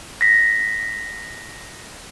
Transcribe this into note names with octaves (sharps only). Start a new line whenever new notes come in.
A#6 B6